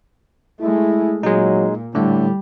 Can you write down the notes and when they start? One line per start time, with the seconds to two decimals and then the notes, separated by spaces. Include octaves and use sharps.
0.60 G#3 A3 E4
1.23 A#2 F#3 G#3 D#4
1.95 A2 D3 G3 A3